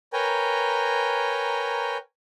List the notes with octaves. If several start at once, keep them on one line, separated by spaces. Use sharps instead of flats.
A#4 B4 C#5 G5 G#5 A#5